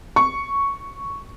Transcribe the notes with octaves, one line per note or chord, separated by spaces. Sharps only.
C#6